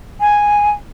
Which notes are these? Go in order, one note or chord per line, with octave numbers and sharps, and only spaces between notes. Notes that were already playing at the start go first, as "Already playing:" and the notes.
G#5